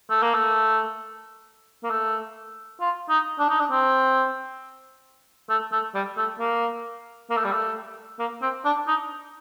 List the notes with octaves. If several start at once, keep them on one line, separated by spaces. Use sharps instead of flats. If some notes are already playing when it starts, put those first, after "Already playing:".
A3
A#3
A3
A#3
A3
F4
D#4
D4
D#4
D4
C4
A3
A3
G3
A3
A#3
A#3
A3
G3
A3
A#3
C4
D4
D#4